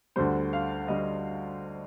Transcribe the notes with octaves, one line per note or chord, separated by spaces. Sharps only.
D2 D3 G3 C5
F5
D3 G3 D#5